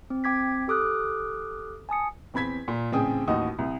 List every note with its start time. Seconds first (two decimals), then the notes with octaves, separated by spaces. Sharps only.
0.10 C4
0.24 C4 G5 D6 G#6 B6
0.68 G4 A4 D6 D#6 F6 F#6
1.89 G#5 A5 D#6 C#7
2.34 E2 C4 B5 G#6 B6
2.68 A#2
2.92 A1 C#3 C4 G#4 G5 D#6
3.28 A1 D#2 D#4 F#4 D#6
3.58 C2